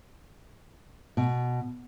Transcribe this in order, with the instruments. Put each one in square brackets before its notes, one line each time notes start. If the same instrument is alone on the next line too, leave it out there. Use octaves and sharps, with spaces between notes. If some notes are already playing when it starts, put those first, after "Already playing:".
[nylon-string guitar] B2